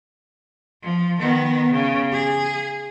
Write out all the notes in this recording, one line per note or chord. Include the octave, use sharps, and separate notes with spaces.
F3
D#3 B3
C#3
G#4